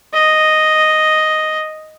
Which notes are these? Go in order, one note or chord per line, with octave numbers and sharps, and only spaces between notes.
D#5